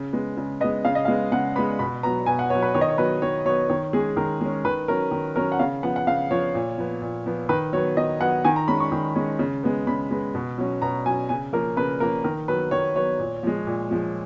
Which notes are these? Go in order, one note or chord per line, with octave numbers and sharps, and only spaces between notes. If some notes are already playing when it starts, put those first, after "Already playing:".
Already playing: C#3
G#3 B3
C#3
G#3 B3 D#5
C#3 F5
D#5
G#3 B3 F5
C#3 F#5
G#3 B3 B5
B2 B5
F#3 B3 A#5
B2 G#5
F#5
F#3 B3 C#5
B4
D#3 C#5
D#5
C#5
F#3 B3 B4
D#3 C#5
F#3 B3 C#5
D#3 C#5
G#3 C#4 G#4
D#3 A#4
G#3 C#4
D#3 B4
F#3 C#4 A#4
D#3
F#3 C#4 A#4
F#5
C#3 F5
F3 B3 F#5
F#5
C#3 F5
F3 B3 C#5
A#2
F3 B3
A#2
F3 B3
D#3 B4
F#3 B3 C#5
D#3 D#5
F#3 B3 F#5
D#3 G#5
A#5
G#3 C#4 B5
C#6
D#3
G#3 C#4
C#3
G#3 B3
C#3 B5
G#3 B3
B2
F#3 C#4
B2 A#5
F#3 C#4 G#5
C#3 G#5
F3 A#3 C#4 A#4
C#3 B4
F3 A#3 C#4 A#4
D#3 A#4
F#3 B3 B4
D#3 C#5
F#3 B3 C#5
A#2
F3 G#3
A#2
F3 G#3